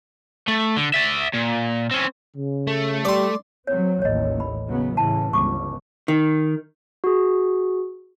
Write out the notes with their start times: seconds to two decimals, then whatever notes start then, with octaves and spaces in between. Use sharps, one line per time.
0.48 A3
0.77 D3
0.94 D5 E5
1.33 A#2
1.91 C4 C#4
2.35 C#3
2.67 A3
3.05 G3 D5 C6
3.67 F#3 C4 C#5
4.02 A1 D#2 C#5 D#5
4.40 B5
4.69 C#3 F#3 B3
4.97 A2 C#3 E3 A5
5.33 G1 C#2 C#6 D6
6.08 D#3
7.04 F#4 G#4